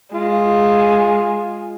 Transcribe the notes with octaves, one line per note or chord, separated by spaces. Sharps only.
G#3 F4